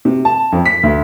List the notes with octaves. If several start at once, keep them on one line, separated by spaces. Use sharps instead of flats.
C3
A5
F2
B6
D2